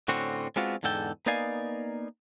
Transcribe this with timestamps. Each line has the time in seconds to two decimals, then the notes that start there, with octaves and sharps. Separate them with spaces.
0.08 A2 D3 C4 C#4 F#4
0.56 G#3 B3 C4 D4 F4 F#4
0.83 E2 G#2 D3 A4 G5
1.26 A#3 B3 D#4 D5 F5 G#5